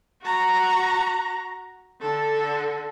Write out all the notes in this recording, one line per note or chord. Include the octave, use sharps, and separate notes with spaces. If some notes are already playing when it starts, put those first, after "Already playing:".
F#4 A#5
D3 A4